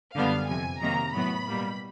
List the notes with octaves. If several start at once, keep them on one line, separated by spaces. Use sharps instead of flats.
F#2 D3 G3 B3 F5
F2 C3 F3 G#5
C3 D#3 F#3 A#3 A#5
A2 F#3 B3 B5
B2 G3 A#3